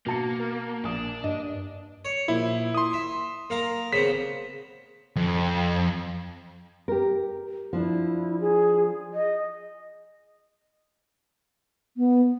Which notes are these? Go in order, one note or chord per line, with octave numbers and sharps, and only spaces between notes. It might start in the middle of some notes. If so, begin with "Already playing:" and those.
B2 A#3 A5 C#7
A#4
A#1 D4 D#6
G2 D#5
C#5
A#1 E4
C6 D#6
E5
A#3 F5 A#5
C#3 B3 C4 B6
F2
G4 A#4
F3 D4 E4
G#4
D#5
B3